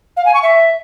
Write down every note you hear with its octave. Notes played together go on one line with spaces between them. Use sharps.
F5
G#5
C#6
E5